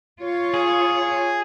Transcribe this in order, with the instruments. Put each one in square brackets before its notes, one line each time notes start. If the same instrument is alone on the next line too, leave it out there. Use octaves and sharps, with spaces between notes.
[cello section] F4 C#5
[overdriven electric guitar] G#4